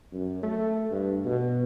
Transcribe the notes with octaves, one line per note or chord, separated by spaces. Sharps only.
F#2
A3
G2
B2